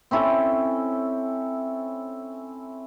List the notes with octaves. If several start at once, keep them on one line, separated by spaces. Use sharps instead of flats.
C4 C#4 E4 A4